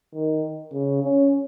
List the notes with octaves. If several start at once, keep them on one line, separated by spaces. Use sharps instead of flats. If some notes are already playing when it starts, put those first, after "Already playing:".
D#3
C#3
C#4